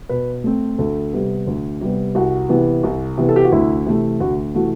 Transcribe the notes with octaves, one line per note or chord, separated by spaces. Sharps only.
B2 B4
A3 C4
D2 A4
C3 G3 B3
D2
C3 G3 B3
C2 F#4
C3 E3 B3
C2
C3 E3 B3
A4
G4
F#4
D2 E4
C3 E3 A3
D2 F#4
C3 E3 A3 F#4